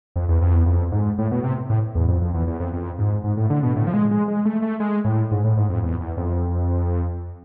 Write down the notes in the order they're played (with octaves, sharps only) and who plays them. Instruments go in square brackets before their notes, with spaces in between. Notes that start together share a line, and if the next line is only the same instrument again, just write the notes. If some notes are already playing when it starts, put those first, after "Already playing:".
[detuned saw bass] F2
E2
F2
E2
F2
G#2
A2
B2
C3
A2
E2
F2
F2
E2
E2
F2
F2
G#2
G#2
A2
D3
B2
A2
F3
G#3
G#3
G#3
A3
A3
G#3
A2
G#2
A2
G#2
F2
E2
E2
F2